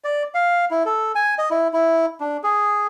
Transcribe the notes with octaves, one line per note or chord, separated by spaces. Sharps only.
D5
F5
E4
A4
G#5
D#5
E4
E4
D4
G#4